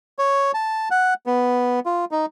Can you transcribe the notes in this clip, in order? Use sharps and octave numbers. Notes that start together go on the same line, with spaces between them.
C#5
A5
F#5
B3
F4
D#4